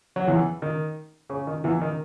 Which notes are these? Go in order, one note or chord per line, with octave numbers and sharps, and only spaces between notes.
F#3
E2 E3
D#3
C#3
D#3
E2 E3
D#3